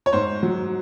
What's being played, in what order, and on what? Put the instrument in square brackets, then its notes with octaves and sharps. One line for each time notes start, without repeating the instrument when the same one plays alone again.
[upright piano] C#5
G#2 C5
F#3